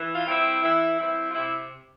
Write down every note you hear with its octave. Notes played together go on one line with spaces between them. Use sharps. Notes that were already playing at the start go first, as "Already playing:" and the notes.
Already playing: E3
F4
G3 C4 E4
E3 E4
G3 C4 E4
F4
C3 E4